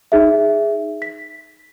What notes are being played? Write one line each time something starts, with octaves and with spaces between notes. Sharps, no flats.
D#4 G#4 E5
B6